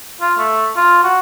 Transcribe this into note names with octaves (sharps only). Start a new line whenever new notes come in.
F4
A3
F4
F#4